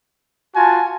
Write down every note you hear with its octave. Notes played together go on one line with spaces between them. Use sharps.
F4 F#4 G#5 A5